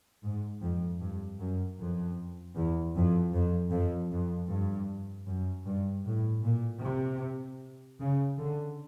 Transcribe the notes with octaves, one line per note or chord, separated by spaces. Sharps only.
G#2
F2
G2
F#2
F2
E2
F2
F2
F2
F2
G2
F#2
G2
A2
A#2
C3
C#3
D3